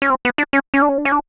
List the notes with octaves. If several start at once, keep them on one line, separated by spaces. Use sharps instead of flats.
C#4
C4
B3
D4
C#4
C#4
D4
C#4
D4
C#4
D4